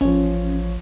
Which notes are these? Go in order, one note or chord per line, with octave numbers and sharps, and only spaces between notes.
A1 F3 C#4 C#5